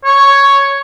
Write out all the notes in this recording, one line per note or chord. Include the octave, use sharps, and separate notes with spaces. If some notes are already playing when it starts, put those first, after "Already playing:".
C#5